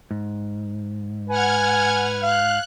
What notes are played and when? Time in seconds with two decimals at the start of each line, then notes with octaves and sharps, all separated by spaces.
0.11 G#2
1.30 B4 F#5 G#5 F6 G#6
2.23 F5 F#6